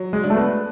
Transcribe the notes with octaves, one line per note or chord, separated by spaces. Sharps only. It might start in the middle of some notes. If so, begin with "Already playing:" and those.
Already playing: F#3
G#3
D4
A3
B3